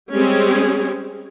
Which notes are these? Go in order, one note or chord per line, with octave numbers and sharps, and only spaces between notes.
G3 G#3 C4 C#4 G4 G#4